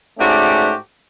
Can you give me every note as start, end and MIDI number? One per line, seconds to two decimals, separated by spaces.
0.19 0.73 44
0.19 0.73 57
0.19 0.73 61
0.19 0.73 66
0.19 0.73 67
0.19 0.73 74